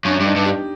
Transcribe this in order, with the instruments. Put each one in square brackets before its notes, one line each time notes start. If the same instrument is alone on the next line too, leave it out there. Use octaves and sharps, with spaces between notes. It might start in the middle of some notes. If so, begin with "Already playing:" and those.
[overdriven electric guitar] F#2 [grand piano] D4
[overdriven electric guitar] G2
[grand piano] D#4
[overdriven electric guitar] G2
[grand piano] G4